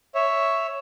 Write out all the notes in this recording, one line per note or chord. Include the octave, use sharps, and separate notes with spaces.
C#5 E5